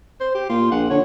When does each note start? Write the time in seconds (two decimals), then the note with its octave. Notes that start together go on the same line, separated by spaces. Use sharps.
0.20 C5
0.35 G4
0.50 A#2 F4
0.72 A#1 F#5
0.90 D3 C#5